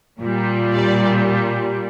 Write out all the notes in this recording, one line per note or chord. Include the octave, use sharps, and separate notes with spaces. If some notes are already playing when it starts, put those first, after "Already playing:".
A#2 G3
D5